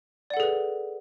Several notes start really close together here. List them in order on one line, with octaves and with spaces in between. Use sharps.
D5 F#5 A4 G#4 B4